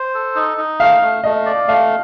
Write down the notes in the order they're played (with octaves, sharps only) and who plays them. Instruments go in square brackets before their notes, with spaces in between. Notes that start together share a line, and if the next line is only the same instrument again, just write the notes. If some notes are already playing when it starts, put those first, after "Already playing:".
Already playing: [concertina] C5
A4
D#4
D#4
[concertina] A3 [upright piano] F5
[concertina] A3
[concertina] A3 [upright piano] D#5
[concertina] D5
[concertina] A3 [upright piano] F5